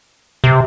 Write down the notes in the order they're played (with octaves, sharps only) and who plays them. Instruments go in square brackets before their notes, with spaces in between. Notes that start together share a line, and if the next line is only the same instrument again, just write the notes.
[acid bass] C3